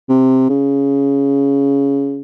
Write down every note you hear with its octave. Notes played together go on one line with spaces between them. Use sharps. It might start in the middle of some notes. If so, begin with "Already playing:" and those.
C3
C#3